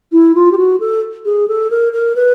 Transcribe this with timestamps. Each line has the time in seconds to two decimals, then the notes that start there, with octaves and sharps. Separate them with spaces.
0.12 E4
0.35 F4
0.51 G4
0.57 F#4
0.80 A4
1.25 G#4
1.47 A4
1.70 A#4
1.92 A#4
2.15 B4